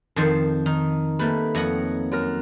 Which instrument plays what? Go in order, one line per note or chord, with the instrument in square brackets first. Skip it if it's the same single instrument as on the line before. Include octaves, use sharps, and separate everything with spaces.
[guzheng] F2 D#3 C5 [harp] A5
[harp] D#3 [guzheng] D#4
[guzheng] G3 A3 [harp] A#3 B4
[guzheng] F2 D#5 F#5 [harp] C#5
[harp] F#2 A#4